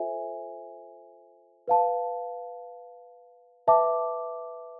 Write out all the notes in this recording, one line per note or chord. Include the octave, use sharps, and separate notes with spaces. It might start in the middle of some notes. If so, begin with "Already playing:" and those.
Already playing: F4 A4 C5 E5 G#5
B4 F5 A5
B4 E5 A5 D6